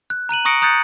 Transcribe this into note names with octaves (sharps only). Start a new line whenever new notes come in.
F#6
A#5 F#6 D#7 F#7
A#5 C#6 D#6 A#6 C#7 D7
A#5 D#6 F#6 G6 A6 C#7